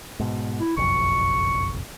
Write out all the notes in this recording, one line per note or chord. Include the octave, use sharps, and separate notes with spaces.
G#2 B2
E4
F#1 B1 F2 C#6